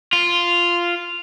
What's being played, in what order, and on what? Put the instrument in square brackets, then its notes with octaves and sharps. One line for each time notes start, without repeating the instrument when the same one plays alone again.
[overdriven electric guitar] F4